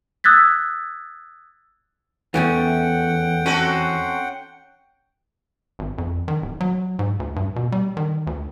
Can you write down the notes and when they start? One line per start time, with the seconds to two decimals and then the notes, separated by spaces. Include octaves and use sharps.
0.24 D#6 E6 F#6 G#6 A6 B6
2.34 E2 E3 A3 C#4 F#5 G5
3.46 C4 C#4 F#4 A4
5.79 G#1
5.98 F2
6.28 D#3
6.42 D1
6.60 F#3
6.99 G#2
7.20 D2
7.36 G2
7.56 B2
7.72 G3
7.97 D#3
8.27 D2